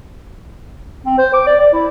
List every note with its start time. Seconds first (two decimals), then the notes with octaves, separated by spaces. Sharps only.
1.06 C4
1.18 C5
1.34 D6
1.46 D5
1.60 D5
1.73 E4